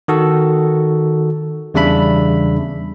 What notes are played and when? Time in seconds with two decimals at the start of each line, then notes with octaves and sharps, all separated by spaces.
0.08 D#3 F#4 A4
1.74 E2 C#3 G3 D4 E5 B5